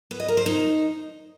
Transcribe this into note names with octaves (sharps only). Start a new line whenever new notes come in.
B3
D#5
A#4
C5
D#4